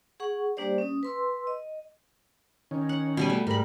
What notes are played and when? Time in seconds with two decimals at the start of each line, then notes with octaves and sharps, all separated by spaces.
0.20 G#4 F#5 C#6
0.57 G3 A#3 D4 G4 C5 D5
0.78 C#4 D#6
1.03 B4 C6 E6
1.47 D#5
2.71 D#3 C#4
2.89 F#5
3.17 B2 G3 G#5
3.30 A3
3.47 G#2 G3 A#4 B5